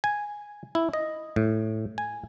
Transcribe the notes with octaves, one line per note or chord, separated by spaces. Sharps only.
G#5
E4
D#5
A2
G#5